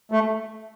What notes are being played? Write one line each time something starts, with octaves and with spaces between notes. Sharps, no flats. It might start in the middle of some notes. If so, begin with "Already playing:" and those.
A3